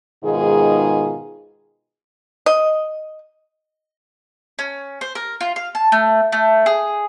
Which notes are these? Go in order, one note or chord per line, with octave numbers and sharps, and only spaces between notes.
G#2 B2 D#3 G#3 F4 G#4
D#5
C#4
C5
A#4
F4
F5
A5
A3
A3
G#4